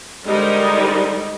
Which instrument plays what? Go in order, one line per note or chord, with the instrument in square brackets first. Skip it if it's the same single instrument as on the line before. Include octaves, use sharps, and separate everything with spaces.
[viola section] D3 G3 G#3 D#4 A#4 C5